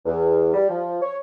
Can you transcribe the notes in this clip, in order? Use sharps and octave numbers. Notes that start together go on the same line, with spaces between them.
E2
G3
F3
C#5